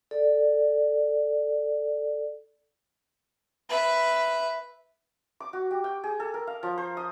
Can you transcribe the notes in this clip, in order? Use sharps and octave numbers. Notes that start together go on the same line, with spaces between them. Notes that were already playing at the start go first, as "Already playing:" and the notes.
A4 D5
B4 E5
D6
F#4
G4
G5
G#4
A4
A#4
F5
F3
C5
D#6